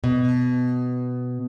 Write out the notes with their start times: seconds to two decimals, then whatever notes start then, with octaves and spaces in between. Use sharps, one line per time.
0.04 B2